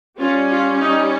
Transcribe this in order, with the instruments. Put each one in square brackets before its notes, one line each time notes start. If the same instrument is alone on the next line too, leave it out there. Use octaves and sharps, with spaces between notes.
[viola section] G3 C#4 F4
F4
D#4